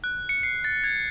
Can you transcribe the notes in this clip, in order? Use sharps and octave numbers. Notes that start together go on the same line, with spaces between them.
F#6
C#7
C7
A6
G#6